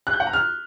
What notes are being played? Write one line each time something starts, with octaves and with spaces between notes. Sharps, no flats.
F#6
G6
F#5
A#5
F6